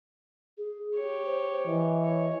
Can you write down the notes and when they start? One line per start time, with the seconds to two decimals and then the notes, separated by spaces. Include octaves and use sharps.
0.58 G#4
0.95 G4 C#5
1.26 C5
1.67 E3 D#5
2.04 C#5